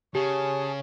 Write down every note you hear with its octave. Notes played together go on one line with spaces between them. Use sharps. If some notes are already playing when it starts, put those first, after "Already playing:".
C#3 G4 G#4 C#5 A5